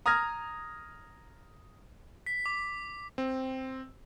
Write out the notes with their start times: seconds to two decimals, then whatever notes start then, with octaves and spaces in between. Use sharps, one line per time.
0.06 A#5 D#6 F6 G#6 A#6
2.26 B6
2.46 D6
3.18 C4